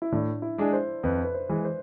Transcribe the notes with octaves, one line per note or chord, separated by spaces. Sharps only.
E4
A2 D4
E4
G#3 D4 G#4
C5
F2 B4
B4
C5
E3 G#3
C5